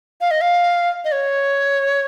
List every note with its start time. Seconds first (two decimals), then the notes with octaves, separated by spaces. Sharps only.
0.21 F5
0.31 D#5
0.41 F5
1.05 D#5
1.12 C#5